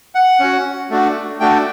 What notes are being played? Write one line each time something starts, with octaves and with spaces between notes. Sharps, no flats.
F#5
C#4 F#4
A3 D4 F#4
A3 D4 F#4 G5